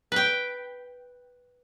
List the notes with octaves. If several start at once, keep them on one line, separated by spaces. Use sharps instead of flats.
B4 G5